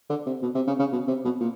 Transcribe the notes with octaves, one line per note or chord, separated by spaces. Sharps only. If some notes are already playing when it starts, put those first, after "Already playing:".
D3
C3
B2
C3
C#3
C#3
B2
C3
B2
A#2